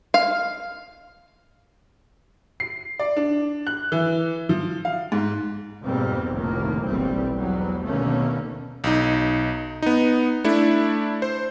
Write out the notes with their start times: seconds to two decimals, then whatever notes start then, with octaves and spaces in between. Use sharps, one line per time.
0.14 F5
2.60 C7
2.99 D5
3.17 D4
3.67 F#6
3.92 E3
4.49 F3
4.85 F5
5.12 G#2
5.83 F2 G#2 B2 G3 A#3 C4
6.32 F1 A#1 D#2 A2 D#3 A#3
6.86 F#1 B1 G2 E3 G3 C4
7.40 E2 G#2 F#3 G3
7.85 D#2 B2 D3 A3 A#3 C#4
8.84 B1 D#4
9.82 B3 D#4
10.44 A3 D4 E4
11.22 C5